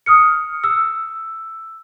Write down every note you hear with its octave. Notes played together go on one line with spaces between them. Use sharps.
D#6 F6 C#7
E6